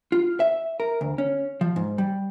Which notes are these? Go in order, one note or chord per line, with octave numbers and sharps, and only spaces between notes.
F4
E5
A#4
D2
C#4
F3
G#2
G3